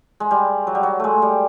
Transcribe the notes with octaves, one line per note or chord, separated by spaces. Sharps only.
G#3
G3
F#3
G3
F#3
G#3 A3
G3